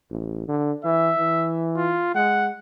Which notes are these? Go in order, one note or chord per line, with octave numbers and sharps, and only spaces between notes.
A1
D3
E3 E5
E3
F4
G#3 F#5